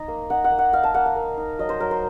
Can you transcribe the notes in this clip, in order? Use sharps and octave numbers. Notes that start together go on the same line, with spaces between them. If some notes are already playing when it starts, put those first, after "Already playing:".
Already playing: D#4
A#3
D#4 F#5
F#5
A#3
F#5
D#4 F5
A5
A#3 F#5
F5
A#3
D#4
F#3 D#5
C5
F#3 A#4
C5